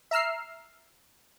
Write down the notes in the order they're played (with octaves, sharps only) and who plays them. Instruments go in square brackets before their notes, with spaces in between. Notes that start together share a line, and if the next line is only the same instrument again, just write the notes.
[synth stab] E5 A#5 E6 F6 C7